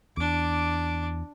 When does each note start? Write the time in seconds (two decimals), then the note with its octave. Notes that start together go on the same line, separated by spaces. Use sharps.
0.17 E2 D4 D6